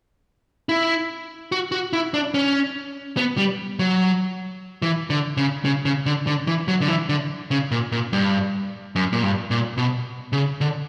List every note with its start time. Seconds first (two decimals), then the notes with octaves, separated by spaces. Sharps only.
0.69 E4
1.52 F#4
1.72 F#4
1.93 E4
2.14 D4
2.34 C#4
3.17 B3
3.38 G3
3.79 F#3
4.82 E3
5.10 D3
5.37 C#3
5.65 C#3
5.85 C#3
6.06 D3
6.27 D3
6.47 E3
6.68 F#3
6.81 D3
6.88 E3
7.09 D3
7.51 C#3
7.71 A#2
7.92 A#2
8.13 G2
8.96 F#2
9.13 A#2
9.23 G2
9.51 A#2
9.78 B2
10.33 C#3
10.61 D3